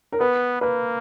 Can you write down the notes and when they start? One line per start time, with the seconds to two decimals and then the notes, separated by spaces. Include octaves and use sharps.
0.12 A#4
0.20 B3 B4
0.61 A#3 B4